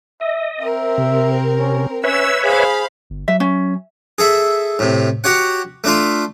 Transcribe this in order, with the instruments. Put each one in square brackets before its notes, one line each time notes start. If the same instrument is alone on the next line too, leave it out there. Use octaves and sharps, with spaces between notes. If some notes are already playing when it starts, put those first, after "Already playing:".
[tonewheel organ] D#5 [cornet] E5
[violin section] C4 A#4 [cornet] E5
[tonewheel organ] C3
[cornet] C#4
[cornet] C#4 [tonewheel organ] B4 C#5 E5 [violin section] E6
[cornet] G#4 [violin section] C5 F5 B5
[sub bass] G1
[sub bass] F#3 [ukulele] E5
[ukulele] C#4
[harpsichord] G#4 A4 E5
A2 C3
F#4 G4 C#5 F#5
A3 D4 F4